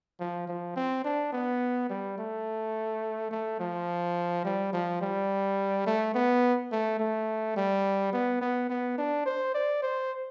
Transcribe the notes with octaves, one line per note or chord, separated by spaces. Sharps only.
F3
F3
C4
D4
B3
G3
A3
A3
F3
G3
F3
G3
A3
B3
A3
A3
G3
B3
B3
B3
D4
C5
D5
C5